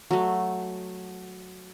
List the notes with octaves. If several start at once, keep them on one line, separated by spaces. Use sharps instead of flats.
F#3 A3